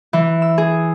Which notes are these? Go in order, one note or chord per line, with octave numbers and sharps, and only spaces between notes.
E3
E6
G#4